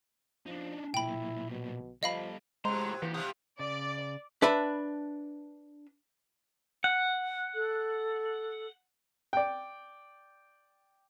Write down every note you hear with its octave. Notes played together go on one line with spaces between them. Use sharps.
F3 D4 D#4
B1 A#2 E4 G5 B5
B2
F3 G3 A4 D#5 F5 B5
A2 C3 F#3 G#3 C5 A#5
A#2 E3 G4
C3 G3 G4 F5 D#6
C#3 D5
D4 B4 E5 B5
F#5
A4
D5 G5